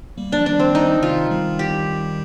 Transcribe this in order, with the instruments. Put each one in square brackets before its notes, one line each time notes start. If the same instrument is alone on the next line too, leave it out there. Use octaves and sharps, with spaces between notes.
[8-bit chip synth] G3 A#3
[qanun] D4
[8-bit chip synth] F3
[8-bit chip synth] D#3 G3 [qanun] D4
[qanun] C4
D#4
[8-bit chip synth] C3 D#3 [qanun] F4
[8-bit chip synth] D#3 G3
[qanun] G4